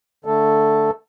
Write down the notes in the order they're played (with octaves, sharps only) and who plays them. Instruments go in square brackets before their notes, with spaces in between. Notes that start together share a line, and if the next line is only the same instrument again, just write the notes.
[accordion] D3 A3 A4